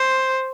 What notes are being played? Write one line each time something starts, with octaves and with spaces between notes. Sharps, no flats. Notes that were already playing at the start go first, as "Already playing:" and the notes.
Already playing: C5